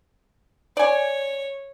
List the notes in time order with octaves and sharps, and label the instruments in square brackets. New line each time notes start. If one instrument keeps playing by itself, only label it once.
[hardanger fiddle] C#5 [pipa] D5 G#5